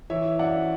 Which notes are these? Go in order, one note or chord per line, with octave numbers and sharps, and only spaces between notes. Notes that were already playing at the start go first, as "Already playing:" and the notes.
E3 C#5 E5
F#2 D5 F#5